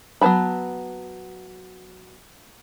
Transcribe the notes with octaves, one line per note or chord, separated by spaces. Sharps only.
F#3 B3 B4 A5 B5